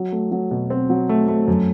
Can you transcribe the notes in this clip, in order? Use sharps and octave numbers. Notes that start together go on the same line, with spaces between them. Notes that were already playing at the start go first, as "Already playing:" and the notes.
Already playing: F#3
A3
F#3
B2
C4
F#3
A3
A3
F#2